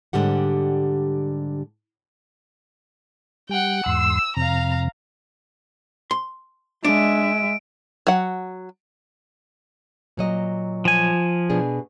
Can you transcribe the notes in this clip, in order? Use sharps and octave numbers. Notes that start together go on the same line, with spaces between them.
G#2 D3 G3 G4 F#5
G3 F#5 G5
E2 G#2 C6 E6
F2 C3 F5 A#5
C6
G#3 D4 E5 D7
F#3 F#5
A#2 F#3 D#5
F3 G#5
B2 D4 G#4